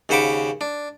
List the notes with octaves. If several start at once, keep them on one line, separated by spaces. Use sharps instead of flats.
D#2 C#3 C5 F#5 B5 D6
D4